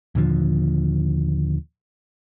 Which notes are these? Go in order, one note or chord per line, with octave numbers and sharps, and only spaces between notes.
D#2 A#2 D3 F3